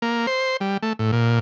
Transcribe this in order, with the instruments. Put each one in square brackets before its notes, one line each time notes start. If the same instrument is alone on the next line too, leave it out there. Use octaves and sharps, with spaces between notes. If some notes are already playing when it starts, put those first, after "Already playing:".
[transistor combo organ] A#3
C5
G3
A3
A2
A#2